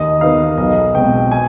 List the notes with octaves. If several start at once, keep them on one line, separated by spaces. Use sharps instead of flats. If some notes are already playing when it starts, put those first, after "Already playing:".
Already playing: D#2 D#5
D#3 B3 D#4 F5
B1 D#5
B2 G#3 C4 G5
G#5